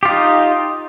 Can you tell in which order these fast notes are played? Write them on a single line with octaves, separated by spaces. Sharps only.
G4 F4 D#4